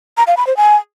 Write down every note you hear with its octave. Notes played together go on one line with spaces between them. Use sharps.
A#5
F5
B5
C5
G#5